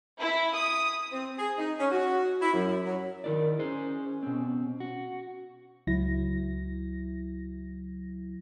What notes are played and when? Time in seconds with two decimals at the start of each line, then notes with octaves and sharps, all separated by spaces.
0.19 E4
0.55 D#6
1.12 C4
1.38 G#4
1.58 D#4
1.79 C#4
1.92 F#4
2.41 E4
2.54 F#2
2.84 F#3
3.24 D#3 E4 A#4 D5
3.59 C#4 G#4 C5
4.23 B2 C4
4.80 F#4
5.87 C#2 F#3 E4 A#6